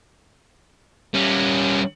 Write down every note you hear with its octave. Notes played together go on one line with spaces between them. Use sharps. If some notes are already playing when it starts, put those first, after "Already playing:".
G3 C#4